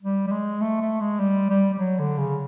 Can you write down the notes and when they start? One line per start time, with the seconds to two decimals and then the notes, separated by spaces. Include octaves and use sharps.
0.02 G3
0.27 G3
0.32 G#3
0.61 A3
0.81 A3
1.01 G#3
1.20 G3
1.50 G3
1.73 G3
1.79 F#3
1.99 D3
2.18 C#3